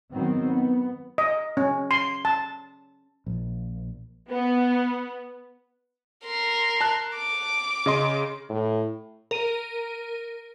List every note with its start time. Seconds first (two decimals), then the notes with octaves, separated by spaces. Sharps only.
0.11 D#3 F#3 B3 C4
0.45 B3
1.18 D#5
1.57 C#4
1.91 C6
2.25 A5
3.26 A#1
4.30 B3
6.25 A#4 C6
6.81 A5 F#6
7.16 D6
7.86 C#3 D#5 C6
8.49 A2
9.31 A#4 D#7